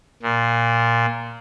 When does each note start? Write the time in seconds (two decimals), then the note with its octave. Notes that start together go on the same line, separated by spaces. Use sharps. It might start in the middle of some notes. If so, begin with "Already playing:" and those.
0.22 A#2